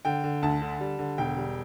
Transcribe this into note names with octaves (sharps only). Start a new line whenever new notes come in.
D3 G5
D3
D2 A5
D3
G3
D3
E1 G5
G3